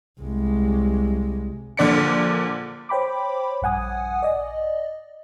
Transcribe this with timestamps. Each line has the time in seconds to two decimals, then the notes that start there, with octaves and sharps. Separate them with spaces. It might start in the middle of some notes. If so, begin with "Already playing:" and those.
0.21 C2 G#3
1.77 A#1 A#2 D3 D5 B6 C#7
2.89 C5 C#5 G5 B5 D6
3.62 A#1 G2 F#5 G#5 D#6
4.22 D5 D#5